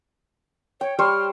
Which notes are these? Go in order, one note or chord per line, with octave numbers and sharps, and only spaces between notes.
C#5 G5
G3 C5 C#5 F6